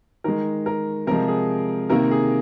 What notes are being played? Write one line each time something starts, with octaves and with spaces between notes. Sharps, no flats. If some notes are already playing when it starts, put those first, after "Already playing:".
D#3 G#3 A#4
A#4
C3 F3 G#3 A#4
G#4
C3 D#3 A#3 A#4
G#4